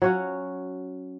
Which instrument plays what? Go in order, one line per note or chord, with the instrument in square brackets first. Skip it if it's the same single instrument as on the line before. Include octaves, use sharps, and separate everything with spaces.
[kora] F#3 C#4 F#4